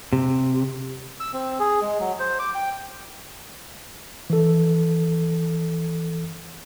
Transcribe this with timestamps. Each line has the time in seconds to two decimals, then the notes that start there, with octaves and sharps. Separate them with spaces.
0.13 C3
1.20 E6
1.33 C4
1.60 G#4
1.82 G#3
1.99 F#3
2.19 C5
2.39 D6
2.55 G5
4.30 E3 A4